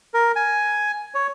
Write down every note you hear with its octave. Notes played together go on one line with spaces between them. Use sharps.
A#4
G#5
C#5